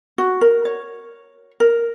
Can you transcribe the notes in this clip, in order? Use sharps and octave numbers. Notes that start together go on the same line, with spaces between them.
F#4
A#4
C#5
A#4